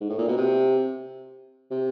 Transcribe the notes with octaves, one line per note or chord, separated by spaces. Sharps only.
G#2
A2
A#2
B2
C3
C3